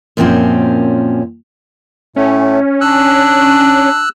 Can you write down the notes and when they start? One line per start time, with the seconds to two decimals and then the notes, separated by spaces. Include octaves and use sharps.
0.17 F#2 A#2 F3 C4 C#4
2.16 A2 A3 C#4
2.81 D4 E6 F#6